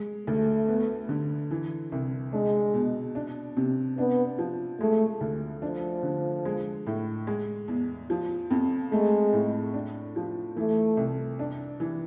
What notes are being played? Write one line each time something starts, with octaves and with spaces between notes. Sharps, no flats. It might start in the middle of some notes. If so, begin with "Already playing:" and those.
Already playing: G#3
D2 A3
B3
D3
E3
C2
G#3 D4
B2
D4
C3
B3 D4
F3
G#3 A3
D2
F3 D4
D3
G#3
A2
G#3
E2
F3
F2
G#3 A3
A2
D4
F3
E3 A3
C2
D4
E3